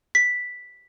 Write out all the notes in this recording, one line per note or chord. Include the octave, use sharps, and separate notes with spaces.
B6